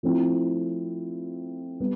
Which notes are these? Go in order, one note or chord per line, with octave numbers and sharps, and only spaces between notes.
F3 A3 C4 E4
G3 B3